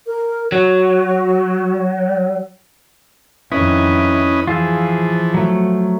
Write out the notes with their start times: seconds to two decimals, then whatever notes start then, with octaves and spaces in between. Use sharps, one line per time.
0.07 A#4
0.52 F#3 F#4
3.52 F2 D#3 C#4 E4 B4 D#5
4.48 E3 F3 F4 G#4 E6
5.34 F#3 A3